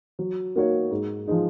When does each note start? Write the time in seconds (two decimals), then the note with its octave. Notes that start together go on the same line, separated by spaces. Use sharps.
0.19 F#3
0.56 A#3 D#4 F#4 C#5
0.91 G#2
1.28 F3 G#3 D#4